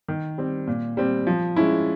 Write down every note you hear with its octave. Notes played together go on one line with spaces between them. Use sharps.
D#3
G3 C4
A#2
G3 C4
F3
G#3 C#4 E4